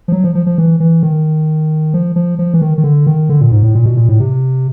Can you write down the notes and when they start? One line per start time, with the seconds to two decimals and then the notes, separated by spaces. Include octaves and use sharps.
0.08 F3
0.12 F#3
0.24 F3
0.35 F3
0.46 F3
0.58 E3
0.80 E3
1.03 D#3
1.94 F3
2.16 F3
2.39 F3
2.54 E3
2.62 D#3
2.78 D#3
2.84 D3
3.07 D#3
3.29 D3
3.41 A#2
3.52 G#2
3.63 A2
3.75 A#2
3.86 B2
3.97 A#2
4.09 A2
4.20 C3